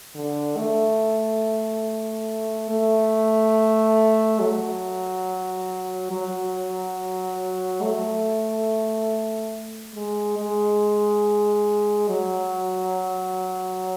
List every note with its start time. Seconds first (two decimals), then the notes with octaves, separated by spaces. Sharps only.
0.15 D3
0.58 A3
2.70 A3
4.41 F#3
6.11 F#3
7.82 A3
9.95 G#3
10.38 G#3
12.08 F#3